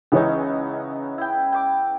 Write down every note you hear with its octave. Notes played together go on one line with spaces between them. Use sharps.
C#2 E3 B3 C#4 D#4
E4 G5
G5 D6